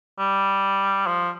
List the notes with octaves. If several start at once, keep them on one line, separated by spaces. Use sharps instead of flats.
G3
F3